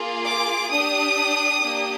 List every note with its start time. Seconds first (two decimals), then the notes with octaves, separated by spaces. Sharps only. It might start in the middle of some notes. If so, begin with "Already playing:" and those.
Already playing: A#3 F4 G#4
0.24 D6
0.70 D4 G4 D#6
1.63 A#3 D4 G4